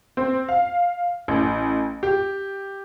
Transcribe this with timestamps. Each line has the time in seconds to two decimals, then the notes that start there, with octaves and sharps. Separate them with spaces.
0.17 C4
0.49 F5
1.28 A1
2.03 G4